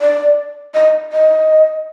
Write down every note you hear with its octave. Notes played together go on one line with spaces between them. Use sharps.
D5
D#5
D#5